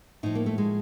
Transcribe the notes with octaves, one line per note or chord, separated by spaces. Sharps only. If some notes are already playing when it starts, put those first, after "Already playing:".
A2 F3 D#4
A#3
A3
G#3